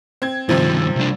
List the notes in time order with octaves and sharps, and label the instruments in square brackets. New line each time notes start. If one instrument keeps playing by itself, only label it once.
[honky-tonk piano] C4 G#6
[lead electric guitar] G2 D#3 [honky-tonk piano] C3 F3
[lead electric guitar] C2 D4